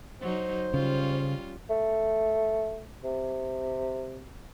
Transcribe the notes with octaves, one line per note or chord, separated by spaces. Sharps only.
F#3 D#4 C5
C#3 G3 C#4 F4
A3
C3